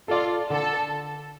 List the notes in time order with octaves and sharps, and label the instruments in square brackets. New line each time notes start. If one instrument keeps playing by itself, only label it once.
[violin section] F4 [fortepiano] A4 D5
[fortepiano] D3 [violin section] A4